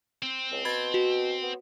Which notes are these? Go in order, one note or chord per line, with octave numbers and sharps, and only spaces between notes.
C4
C#2
B2 B5 G#6 A6
F#4
B3